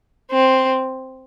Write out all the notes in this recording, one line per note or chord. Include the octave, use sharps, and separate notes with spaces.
C4